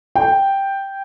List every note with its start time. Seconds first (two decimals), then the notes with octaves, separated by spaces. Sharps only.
0.16 G5